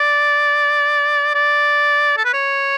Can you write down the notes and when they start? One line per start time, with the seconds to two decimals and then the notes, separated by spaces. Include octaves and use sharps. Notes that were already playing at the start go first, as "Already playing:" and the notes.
Already playing: D5
1.35 D5
2.17 A4
2.25 B4
2.34 C#5